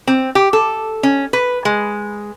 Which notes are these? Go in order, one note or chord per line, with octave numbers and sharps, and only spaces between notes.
C4
G4
A4
C#4
B4
G#3